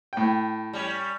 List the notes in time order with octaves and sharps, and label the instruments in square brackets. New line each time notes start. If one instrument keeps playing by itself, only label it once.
[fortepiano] A2 G5
[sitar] G3 C#4